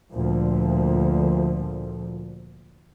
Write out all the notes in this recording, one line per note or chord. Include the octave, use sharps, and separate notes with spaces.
D2 A#2 F3